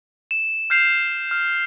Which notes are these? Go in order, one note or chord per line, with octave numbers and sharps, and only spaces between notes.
E7
F6 G6 C7 E7 F7
F6